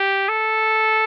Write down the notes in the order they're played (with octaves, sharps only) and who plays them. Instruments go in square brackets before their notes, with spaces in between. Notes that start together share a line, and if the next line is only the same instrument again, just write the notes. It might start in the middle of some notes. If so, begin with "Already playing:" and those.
Already playing: [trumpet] G4
A4